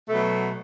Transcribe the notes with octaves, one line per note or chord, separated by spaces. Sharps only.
B2 F#3 A3